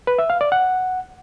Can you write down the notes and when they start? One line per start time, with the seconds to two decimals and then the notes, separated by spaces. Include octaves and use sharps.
0.07 B4
0.18 E5
0.30 F5
0.41 D5
0.52 F#5